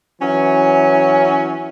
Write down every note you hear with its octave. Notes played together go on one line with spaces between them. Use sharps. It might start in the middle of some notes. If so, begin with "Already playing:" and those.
E3 F#3 C#4